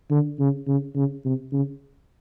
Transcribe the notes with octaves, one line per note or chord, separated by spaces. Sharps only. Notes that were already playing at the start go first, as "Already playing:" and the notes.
D3
C#3
C#3
C#3
C3
C#3